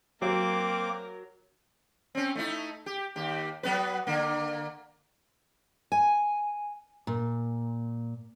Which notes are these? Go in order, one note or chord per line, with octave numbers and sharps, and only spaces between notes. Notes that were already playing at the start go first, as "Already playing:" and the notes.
F#3 A#3 C4 A#4 D6
C4 C#4
A3 D#4 E4
G4
D#2 G4
F#3 B3 B4
D3 A#3
G#5
A#2